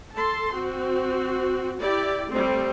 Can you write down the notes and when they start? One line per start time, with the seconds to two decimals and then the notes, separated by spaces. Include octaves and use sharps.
0.15 A4 A5 C6
0.54 C4 F#4
1.82 E4 G4 D5
2.31 G3 A3 C4